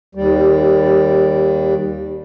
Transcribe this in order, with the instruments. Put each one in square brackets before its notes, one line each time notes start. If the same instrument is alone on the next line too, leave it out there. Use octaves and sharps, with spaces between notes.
[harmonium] D#2 G3